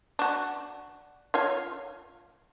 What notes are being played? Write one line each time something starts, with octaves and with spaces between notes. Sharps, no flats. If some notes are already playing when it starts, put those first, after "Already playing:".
D4 F#4
F4 C#5 F5